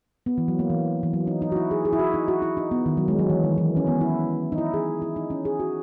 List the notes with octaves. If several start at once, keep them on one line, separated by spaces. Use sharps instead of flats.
B3
E3
F#3
A#3
E3
E3
F#3
D#4
D#4
F#4
E4
G#4
G#4
E4
F#4
D#4
F#4
E4
D#4
B3
D#3
F#3
G#3
F#3
E3
D#3
E3
C#4
B3
E4
D#4
E4
G#4
E4
D#4
C#4
G#4
F#4